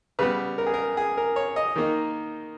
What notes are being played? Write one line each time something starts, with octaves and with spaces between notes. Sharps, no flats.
C#3 G3 B3 B4
A#4
G#4
A#4
G#4
A#4
C#5
D#5
D#3 A#3 D#4